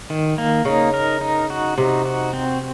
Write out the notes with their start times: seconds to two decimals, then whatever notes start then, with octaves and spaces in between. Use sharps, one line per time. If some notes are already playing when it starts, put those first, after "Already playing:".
0.10 D#3
0.38 A#3
0.65 C#3 D#4
0.94 A#4
1.21 D#4
1.50 F#4
1.78 C3 D#4
2.05 F#4
2.33 C4